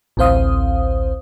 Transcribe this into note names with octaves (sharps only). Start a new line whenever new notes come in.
A1 D2 C4 C5 F5 D#6